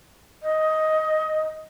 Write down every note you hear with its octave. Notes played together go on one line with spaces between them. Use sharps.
D#5